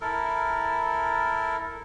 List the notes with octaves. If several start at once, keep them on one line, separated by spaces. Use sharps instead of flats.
E4 A4 A#4